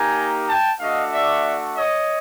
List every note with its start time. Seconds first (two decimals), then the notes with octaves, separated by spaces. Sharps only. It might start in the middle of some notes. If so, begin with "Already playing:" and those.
Already playing: A#3 D#4 G4 G#5 A#5
0.48 G5 A5
0.80 A3 D4 F#4 D#5 F5
1.12 D5 E5
1.76 C#5 D#5